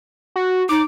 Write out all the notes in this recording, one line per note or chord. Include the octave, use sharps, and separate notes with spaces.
F#4
D#4 D6